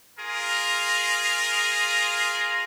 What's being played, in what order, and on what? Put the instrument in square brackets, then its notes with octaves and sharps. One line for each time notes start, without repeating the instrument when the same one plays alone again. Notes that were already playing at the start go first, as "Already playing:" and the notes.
[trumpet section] F4 G#4 A#4